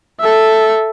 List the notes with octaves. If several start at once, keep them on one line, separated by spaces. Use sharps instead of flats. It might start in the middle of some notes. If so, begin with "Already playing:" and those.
A4 E5